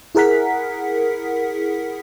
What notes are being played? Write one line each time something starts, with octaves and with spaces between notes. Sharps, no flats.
E4 G#4 A#4 F#5 B6